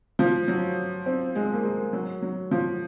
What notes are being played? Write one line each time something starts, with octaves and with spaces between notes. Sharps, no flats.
F3
F#3
C4
G#3
A#3
G#3
F#3
F#3
F3